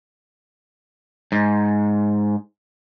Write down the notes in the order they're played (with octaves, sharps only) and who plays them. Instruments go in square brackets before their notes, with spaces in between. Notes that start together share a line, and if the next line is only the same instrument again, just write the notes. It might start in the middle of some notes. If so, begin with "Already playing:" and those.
[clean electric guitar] G#2